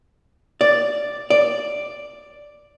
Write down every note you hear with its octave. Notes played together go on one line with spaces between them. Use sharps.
D5
D5